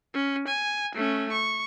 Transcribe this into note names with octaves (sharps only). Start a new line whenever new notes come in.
C#4
G#5
A3 C#4
C#6